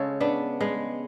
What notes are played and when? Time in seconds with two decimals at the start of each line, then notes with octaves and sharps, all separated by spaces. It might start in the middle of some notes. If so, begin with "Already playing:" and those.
Already playing: C#3 G#3 A4 C#5
0.20 B3 D4
0.60 G#3 B3